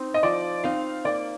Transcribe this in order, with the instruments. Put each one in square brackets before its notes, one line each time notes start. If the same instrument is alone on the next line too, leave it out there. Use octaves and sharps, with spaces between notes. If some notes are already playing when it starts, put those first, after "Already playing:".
Already playing: [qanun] C4 D#4
[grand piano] D#5
[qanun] F3 [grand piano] D5
[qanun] C4 D#4 [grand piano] F5
[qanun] A#3 [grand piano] D5